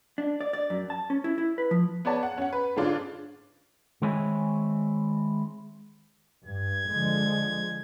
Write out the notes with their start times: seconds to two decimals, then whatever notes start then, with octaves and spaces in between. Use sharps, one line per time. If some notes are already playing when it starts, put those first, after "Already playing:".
0.18 D4
0.41 D5
0.53 D5
0.70 F#2
0.90 A5
1.10 C#4
1.24 E4
1.38 E4
1.58 B4
1.71 F3
2.05 B3 C#5 D5 A5
2.23 F#5
2.38 C#4 F#5
2.53 B4
2.76 G#2 D3 C#4 D4 F4
4.02 D#3 G#3 C4 E4 C#5 G#5
6.46 G2 G#6
6.88 D3 F3 G#3